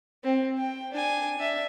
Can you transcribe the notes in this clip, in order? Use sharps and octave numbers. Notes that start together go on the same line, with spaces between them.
C4
G5
D4 G#5
D4 E5